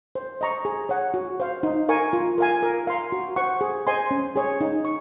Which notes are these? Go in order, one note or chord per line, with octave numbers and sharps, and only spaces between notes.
C5
D#5 A#5 C#6
G#4
C#5 F#5
F#4
C5 F5
D#4
A#4 F5 G#5 C#6
F4
A#4 F5 G#5
A#4
F5 C6
F#4
C5 F#5 C#6
G#4
C5 D#5 G#5 C6
C#4
G#4 C#5
D#4
C#6